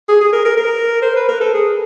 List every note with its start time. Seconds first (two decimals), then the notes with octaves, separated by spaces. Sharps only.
0.08 G#4
0.21 G#4
0.33 A#4
0.45 A#4
0.57 A#4
1.02 C5
1.16 B4
1.28 A#4
1.41 A4
1.54 G#4